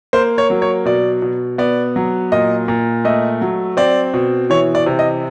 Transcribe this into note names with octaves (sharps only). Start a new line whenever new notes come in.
A#3 C5
C#5
F#3
C#5
B2 D5
B2
B3 D5
F#3
A#2 D#5
A#2
A3 D#5
F#3
C4 D5
B2
E3 C#5
D5
C3
D#5